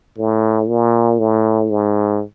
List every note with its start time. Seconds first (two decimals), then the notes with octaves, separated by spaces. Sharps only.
0.18 A2
0.68 A#2
1.19 A2
1.69 G#2